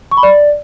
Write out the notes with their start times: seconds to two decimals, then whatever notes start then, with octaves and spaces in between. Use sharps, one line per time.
0.11 C#6
0.17 B5
0.23 D5